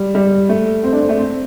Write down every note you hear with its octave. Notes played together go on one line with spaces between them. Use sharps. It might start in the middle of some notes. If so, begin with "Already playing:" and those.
Already playing: G3
G3
A3
C4
D4
C4
A3
C4